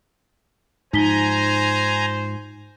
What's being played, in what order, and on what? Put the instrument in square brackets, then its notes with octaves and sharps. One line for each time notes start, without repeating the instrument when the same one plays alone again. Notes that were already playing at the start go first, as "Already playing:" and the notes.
[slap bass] G#2 F3 [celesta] D#4 B6 G7 [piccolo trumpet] C5 [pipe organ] G#5 A#5